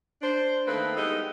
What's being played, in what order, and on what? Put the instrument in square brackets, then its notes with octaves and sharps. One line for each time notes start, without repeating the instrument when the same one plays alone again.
[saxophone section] D4 C5
D#3 A3 A#3 C4 A4 B4
G3 G#3 B3 D#4 E4 A4